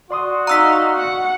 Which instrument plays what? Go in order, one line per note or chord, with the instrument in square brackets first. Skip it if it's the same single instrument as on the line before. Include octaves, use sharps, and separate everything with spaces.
[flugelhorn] F#4 [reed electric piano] D5 C6 D#6
[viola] D#4 F5 [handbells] A#5 E6 B6
[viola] F#5